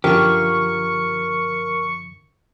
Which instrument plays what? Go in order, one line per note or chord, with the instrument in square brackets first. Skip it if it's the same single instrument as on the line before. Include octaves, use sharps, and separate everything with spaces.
[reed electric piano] F#2 D3 F3 [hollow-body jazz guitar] F4 G4 [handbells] A#4 [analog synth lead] C#6